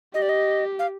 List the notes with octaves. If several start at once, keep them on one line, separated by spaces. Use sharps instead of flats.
G4 D#5
D5
D#5
F5